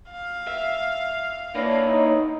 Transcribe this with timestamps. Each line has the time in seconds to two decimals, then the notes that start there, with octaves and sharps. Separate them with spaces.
0.11 F5
0.47 E5
1.55 A#3 B3 D4 E4 C#5
1.87 D#4